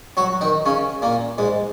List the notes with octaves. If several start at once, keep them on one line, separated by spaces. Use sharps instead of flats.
F#3 F#4
D#3 D#4
C#3 C#4
A#2 A#3
G#2 G#3